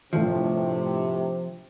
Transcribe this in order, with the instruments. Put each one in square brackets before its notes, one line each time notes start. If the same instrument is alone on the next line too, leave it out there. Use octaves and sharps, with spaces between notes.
[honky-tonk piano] G1 A2 [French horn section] C3 [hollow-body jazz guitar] F3